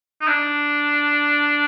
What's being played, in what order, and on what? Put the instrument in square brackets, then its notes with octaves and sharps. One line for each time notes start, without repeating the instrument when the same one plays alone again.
[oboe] D#4
D4